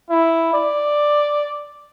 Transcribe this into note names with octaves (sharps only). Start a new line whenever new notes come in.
E4
D5